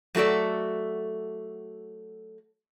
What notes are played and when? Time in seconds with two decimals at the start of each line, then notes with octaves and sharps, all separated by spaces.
0.15 F#3 A3 F#4 A4 D5